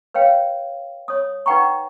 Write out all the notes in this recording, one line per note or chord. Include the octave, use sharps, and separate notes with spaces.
B4 C#5 F5 G5
C#5 D#6
D#4 B4 F#5 G5 A#5 C#6